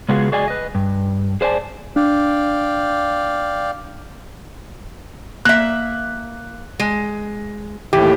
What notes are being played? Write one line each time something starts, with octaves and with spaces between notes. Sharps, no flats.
C#3 G#3 B3 F4 F#4 G#4
F#4 G#4 D5 D#5 G#5
B4 D#5
G2
G#4 C5 D5 G#5 A5
D4 D5 F5 G5
A#3 E5 F#6
G#3
D#2 A2 E3 G4